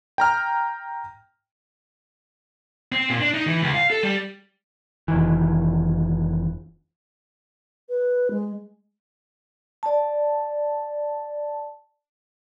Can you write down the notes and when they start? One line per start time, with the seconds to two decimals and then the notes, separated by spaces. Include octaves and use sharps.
0.18 G5 A#5 F6
2.92 C4
3.09 A#2
3.21 D4
3.34 D#4
3.47 E3
3.61 C#2
3.74 F5
3.90 A4
4.03 G3
5.08 F1 D#3 E3
7.89 B4
8.31 G#3
9.83 D5 A5